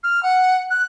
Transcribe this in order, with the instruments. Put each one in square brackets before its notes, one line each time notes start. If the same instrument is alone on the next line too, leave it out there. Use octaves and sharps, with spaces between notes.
[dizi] F6
F#5
F#6